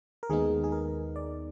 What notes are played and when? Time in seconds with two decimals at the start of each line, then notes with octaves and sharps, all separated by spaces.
0.23 A#4
0.30 D#2 D#3 G#3 B3 D#4 G#4
0.64 G#4
0.72 A#4
1.16 D5